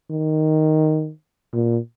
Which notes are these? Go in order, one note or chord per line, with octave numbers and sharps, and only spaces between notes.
D#3
A#2